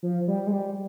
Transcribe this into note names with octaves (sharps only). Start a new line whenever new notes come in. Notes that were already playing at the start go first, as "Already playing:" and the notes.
F3
G3
G#3
G3